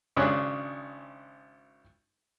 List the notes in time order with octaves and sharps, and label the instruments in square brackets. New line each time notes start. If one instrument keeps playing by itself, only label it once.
[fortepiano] G#1 C#3 D4 C#5 F#6